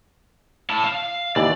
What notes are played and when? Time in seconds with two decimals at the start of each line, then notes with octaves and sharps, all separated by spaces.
0.70 E4 A5
0.84 F5
1.36 D#2 E3 D5